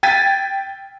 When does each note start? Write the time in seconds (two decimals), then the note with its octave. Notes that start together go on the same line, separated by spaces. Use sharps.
0.03 G5 G#6 A6 B6 D#7